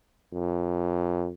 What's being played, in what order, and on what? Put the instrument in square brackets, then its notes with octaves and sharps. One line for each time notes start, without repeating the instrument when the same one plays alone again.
[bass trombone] F2